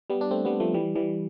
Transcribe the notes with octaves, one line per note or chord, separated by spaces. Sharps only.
G3 B3
D4
A3 C4
G3 B3
F3 A3
E3 G3
E3 G3